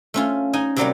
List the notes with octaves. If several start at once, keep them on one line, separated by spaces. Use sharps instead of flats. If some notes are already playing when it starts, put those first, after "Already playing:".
A3 C#4 F4
D#4 G#5
C3 F#3 G3 A#3